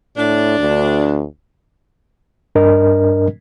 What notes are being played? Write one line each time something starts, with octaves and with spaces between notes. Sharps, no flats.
A2 D4
D2
G2 D4 A#4 D#5